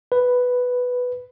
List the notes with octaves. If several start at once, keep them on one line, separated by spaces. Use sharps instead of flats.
B4